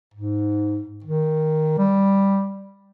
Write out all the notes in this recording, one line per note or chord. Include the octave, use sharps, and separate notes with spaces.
G#2
D#3
G3